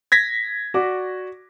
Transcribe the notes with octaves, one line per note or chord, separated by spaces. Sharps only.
G#6 A#6 B6
F#4 D5 D6